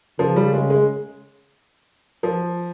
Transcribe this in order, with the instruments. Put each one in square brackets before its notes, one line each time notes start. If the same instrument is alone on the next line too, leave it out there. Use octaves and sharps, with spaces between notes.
[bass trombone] C#3 [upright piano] F3
[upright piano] G3
G#3
G#3
F3